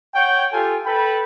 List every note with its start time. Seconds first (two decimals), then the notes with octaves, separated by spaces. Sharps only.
0.15 C#5 F#5 G5
0.53 F4 G4 A4 G#5
0.86 A4 B4 G5 B5